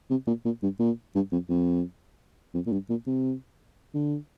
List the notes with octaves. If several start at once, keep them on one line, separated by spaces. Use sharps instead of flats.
C3
A#2
A#2
G2
A#2
G2
F2
F2
F2
A#2
G2
A#2
C3
D3